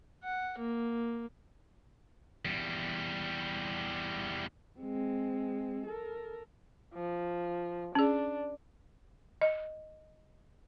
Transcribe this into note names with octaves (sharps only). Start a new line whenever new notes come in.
F#5
A#3
E2 G3
G#3 C4
A4 A#4
F3
C#4 D4 G#4
D#5